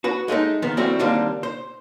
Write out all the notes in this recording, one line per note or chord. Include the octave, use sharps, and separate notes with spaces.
F#4 B4
G#3 A3 D4 D#4
D#3 F3 B3
F3 G3 A3 C4 E4 F#4
D3 D#3 G3 A#3 C4 D4
C5